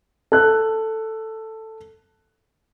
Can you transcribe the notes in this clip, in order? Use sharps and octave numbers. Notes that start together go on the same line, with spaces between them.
A4 F#6